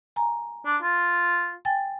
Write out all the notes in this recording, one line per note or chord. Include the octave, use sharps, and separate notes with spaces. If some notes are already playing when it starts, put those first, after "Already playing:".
G#5 A#5
D4
F4
G5 G#5 A6